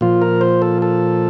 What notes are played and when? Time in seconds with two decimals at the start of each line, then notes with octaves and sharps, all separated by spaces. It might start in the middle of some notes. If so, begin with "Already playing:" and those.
0.01 A#2 F3 F4
0.22 A#4
0.41 C5
0.62 A4
0.82 A4